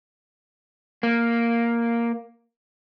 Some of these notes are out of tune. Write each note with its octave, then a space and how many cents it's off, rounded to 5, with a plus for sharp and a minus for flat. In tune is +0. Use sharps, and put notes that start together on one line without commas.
A#3 +0